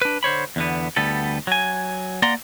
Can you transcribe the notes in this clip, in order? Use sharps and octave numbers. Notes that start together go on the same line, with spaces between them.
D4 B4
D3 C5 C#5 B5
E2 D3 B3
D2 G3 B3 A4
F#3 G#5
A#3 D5 F#5 A#5 C6